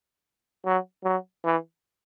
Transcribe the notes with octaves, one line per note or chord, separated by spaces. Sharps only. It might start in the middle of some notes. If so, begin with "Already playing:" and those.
F#3
F#3
E3